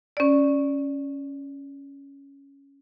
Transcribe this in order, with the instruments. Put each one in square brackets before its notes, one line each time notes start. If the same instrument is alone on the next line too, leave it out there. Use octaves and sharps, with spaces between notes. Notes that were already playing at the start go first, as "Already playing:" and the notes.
[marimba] C#4 D5